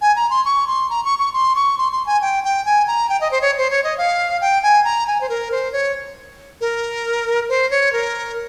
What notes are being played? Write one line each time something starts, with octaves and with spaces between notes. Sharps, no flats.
G#5
A#5
C6
C#6
C6
A#5
C#6
C#6
C6
C#6
C6
C6
G#5
G5
G5
G#5
A#5
G5
D#5
C5
C#5
C5
C#5
D#5
F5
G5
G#5
A#5
G#5
C5
A#4
C5
C#5
A#4
C5
C#5
A#4